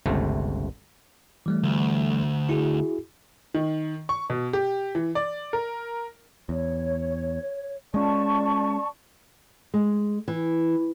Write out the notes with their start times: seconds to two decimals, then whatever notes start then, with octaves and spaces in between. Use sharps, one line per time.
0.06 G1 C#2 C3 A3
1.46 E3 G3 A3
1.63 D2
2.49 E4 F#4 G#4
3.54 D#3
4.09 C#6
4.30 B2
4.53 G4
4.95 E3
5.15 D5
5.53 A#4
6.49 E2 C#5
7.94 G#3 C#4 D5 A5 C#6
9.74 G#3
10.28 E3